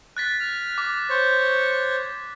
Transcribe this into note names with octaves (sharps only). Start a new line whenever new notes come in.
F#6 A6 B6
F6
D6
C5 C#5 C#6